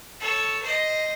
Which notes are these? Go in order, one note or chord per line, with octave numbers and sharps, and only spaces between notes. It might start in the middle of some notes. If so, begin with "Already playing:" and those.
A4 C#5
C5 D#5